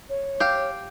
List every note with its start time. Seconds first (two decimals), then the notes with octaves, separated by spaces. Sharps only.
0.09 C#5
0.40 G4 F5